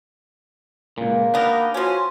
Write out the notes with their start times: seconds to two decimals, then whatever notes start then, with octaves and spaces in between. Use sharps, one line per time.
0.98 C#2 A#2 A#3
1.34 G3 B3 D4 D#4 A#4
1.74 F3 C#4 F#4 G#5 C6